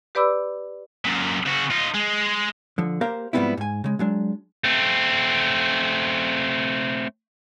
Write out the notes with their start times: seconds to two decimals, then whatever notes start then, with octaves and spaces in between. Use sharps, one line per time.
0.15 G4 B4 D5 B5 D6 E6
1.05 F#2 A#2
1.46 C#3 F#4
1.71 D#4 F4
1.95 G#3
2.78 D3 F3
3.01 A#3 G4 A#4 C5 F5
3.33 G#2 F3 G3 B3 C4 E4
3.57 G#2 G#5
3.84 C#3 G#3
3.99 F#3 G#3 D4
4.64 A3 C4